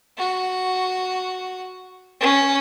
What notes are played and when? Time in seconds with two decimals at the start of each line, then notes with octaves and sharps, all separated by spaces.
0.18 F#4
2.21 C#4